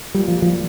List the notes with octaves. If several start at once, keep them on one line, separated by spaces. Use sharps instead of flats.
A#2 G3
F3
F3